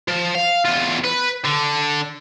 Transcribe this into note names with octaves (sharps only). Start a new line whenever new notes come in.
F3
F5
E2 F4
B4
D3